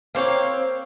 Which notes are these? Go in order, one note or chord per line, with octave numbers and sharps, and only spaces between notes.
A#3 C4 C#5 F5